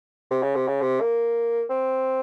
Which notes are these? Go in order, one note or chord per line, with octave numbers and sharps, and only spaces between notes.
C3
C#3
C3
C#3
C3
A#3
C4